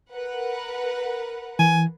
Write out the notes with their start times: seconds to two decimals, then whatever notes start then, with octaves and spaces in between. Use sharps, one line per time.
0.12 A#4 B4 F#5
1.59 E3 G#5